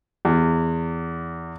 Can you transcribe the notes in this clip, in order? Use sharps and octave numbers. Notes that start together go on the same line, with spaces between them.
E2